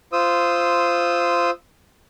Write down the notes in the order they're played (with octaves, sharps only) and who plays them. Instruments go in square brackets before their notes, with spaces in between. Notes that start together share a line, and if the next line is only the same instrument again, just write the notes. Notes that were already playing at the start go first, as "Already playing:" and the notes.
[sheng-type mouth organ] F4 C5 D#6 E6